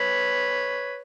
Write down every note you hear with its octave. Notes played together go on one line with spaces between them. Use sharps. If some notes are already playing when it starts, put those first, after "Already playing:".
Already playing: B4 C#5